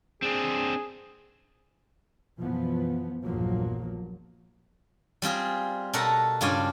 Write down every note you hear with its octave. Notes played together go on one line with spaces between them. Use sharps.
C4 D4 G#4
F#2 B2 E3 F3 B3
A#1 E2 G2 F3 F#3 A#3
G3 C4 F4 G#4
B2 A4 A#4 F#5 A#5
G2 C#3 F4 F#4 D5 G#5